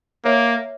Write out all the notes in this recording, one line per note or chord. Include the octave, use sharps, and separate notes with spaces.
A#3 A#4 C#5 E5